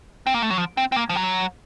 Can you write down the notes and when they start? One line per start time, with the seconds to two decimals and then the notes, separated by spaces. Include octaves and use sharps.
0.27 C4
0.34 A#3
0.42 A3
0.50 F#3
0.58 F3
0.77 C4
0.92 C4
0.96 A#3
1.09 F3
1.16 F#3